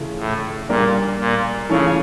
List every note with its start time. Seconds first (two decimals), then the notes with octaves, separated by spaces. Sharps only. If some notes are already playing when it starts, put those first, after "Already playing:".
Already playing: C#3 E3 A3 C#4 F4
0.18 A2
0.69 A#2 G3 A#3 D4
1.19 A#2
1.69 C#3 E3 A3 C#4 F4